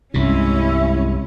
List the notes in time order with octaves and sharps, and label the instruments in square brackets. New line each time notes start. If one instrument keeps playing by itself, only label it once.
[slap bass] C2 G2 C3 [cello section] G#3 C#4 [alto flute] E4